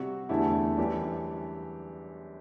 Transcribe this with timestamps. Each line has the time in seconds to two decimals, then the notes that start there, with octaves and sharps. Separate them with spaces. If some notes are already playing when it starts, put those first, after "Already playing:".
Already playing: C3 G3 C4 F#4
0.29 E2 D3 A3 E4 G4
0.77 F#2 E3 G3 D4 G4